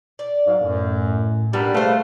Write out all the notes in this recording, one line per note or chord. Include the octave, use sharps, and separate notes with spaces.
D5
G#2 F#3 F5
F#2 A2
A#2 D#3 G3 B3 D4 G4 B4
C#3 A3 B4 C5 F5